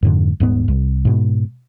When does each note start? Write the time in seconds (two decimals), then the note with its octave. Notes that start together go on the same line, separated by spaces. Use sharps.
0.03 F2 G#2 D3
0.40 D#1 G#2 B3
0.68 C2
1.05 G#2 B2